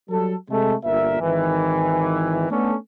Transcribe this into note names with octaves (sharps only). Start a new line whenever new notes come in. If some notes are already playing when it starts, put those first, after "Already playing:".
F#3 G3 A4
C3 G#3 A3
G1 A#2 A#4 E5
G#1 D#3 E3
A3 B3 C#4 D4 A4